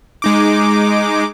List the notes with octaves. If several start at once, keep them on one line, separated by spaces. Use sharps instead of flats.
G#3 D#4 D6